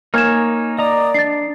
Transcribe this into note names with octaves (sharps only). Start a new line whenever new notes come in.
A#3 D#4 C#5 G#5 F6 G#6 E7
D5 D#5 A#5 D#6
D4 A6 C7